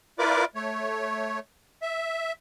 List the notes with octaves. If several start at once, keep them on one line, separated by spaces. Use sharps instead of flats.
E4 F4 A#4 B4 D5 D6
A3 C#5
E5